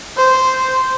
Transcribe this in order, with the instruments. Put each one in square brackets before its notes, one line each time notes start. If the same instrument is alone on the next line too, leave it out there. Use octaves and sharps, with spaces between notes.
[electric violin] C5